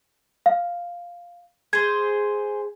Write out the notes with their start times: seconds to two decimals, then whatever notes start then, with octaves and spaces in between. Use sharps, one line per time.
0.46 F5
1.73 G#4 C5 G#6